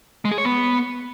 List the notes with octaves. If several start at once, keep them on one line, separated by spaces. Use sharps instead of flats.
G#3
G#4
C#5
B3